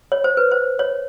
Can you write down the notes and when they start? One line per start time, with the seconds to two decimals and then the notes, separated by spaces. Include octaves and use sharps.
0.12 C#5
0.24 C5
0.37 B4
0.51 C5
0.79 C#5